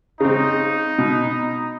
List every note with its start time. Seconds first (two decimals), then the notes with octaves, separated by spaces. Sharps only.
0.20 C#3 C4 D#4
0.99 B2